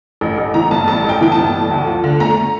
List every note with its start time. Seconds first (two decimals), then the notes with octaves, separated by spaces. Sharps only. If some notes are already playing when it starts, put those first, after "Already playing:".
0.21 A1
0.38 A1
0.54 E3 A#5
0.71 G2 A5
0.88 A1 A5
1.04 A1 G5
1.21 E3 G5
1.32 A5
1.38 G2
1.54 A3
1.71 D2
1.87 F3
2.04 D3
2.20 A3 A#5